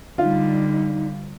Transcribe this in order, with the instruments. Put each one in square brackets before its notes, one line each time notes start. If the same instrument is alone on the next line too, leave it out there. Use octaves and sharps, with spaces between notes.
[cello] D3 G3 [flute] D#4 [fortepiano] F4